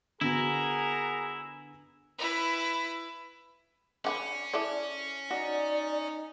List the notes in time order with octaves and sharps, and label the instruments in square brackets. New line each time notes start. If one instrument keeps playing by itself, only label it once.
[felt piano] D3 B3 F#4 [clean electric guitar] E4 [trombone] G#4 [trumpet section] A#4 F#5 A#5
[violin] E4 B4
[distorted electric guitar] C#4 [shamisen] D4 F#5 B5
[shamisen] E4 A4 D5
[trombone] D#4 [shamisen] F#4 [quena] D5